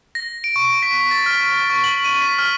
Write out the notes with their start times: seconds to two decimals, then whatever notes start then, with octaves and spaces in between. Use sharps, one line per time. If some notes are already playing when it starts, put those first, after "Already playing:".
0.15 A#6
0.44 D7
0.56 C#6
0.82 B6
1.11 A6
1.26 F6
1.70 C#6
1.84 F#7
2.04 D#7
2.21 B6
2.39 F6